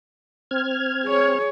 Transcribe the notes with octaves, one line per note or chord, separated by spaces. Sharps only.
C4 F6 G#6
G#4 C#5